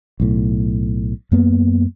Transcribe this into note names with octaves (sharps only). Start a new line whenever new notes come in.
B1 A2
F#2 A#3 B3